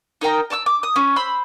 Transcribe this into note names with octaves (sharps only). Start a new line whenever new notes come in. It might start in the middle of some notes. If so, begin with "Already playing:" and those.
D#4 A#4 G5 A#5
D5 A5 C#6 E6
D6
D#6
C#4
C5 B5 E6